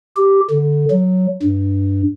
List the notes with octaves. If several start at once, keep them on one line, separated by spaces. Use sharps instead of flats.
G4
D3
F#3
G2